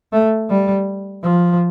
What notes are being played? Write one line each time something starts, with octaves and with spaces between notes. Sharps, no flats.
A3
G3
F3